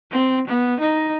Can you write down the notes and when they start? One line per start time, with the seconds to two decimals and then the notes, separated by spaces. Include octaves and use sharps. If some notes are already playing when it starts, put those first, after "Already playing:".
0.11 C4
0.47 B3
0.80 D#4